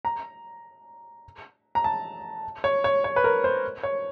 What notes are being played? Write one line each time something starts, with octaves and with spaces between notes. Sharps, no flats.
A#5
A#5
A5
C#5
C#5
C#5
B4
A#4
C5
C#5